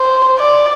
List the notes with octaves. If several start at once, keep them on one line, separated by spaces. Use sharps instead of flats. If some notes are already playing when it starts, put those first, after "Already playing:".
Already playing: C5
D5